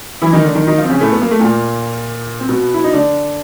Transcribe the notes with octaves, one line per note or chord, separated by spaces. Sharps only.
E3 E4
D#3 D#4
D3 D4
D#3 D#4
D#3 D#4
F3 F4
C4
C#3 C#4
A2 A3
B3
A#3
A3
A#2 A#3
C4
B2 B3
E4
D#4
D3 D4